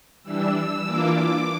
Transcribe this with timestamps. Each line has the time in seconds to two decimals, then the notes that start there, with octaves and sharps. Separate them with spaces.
0.23 E3 G3 D4 E6
0.54 E6
0.85 E3 A#3 D4 F4 D6
1.18 D6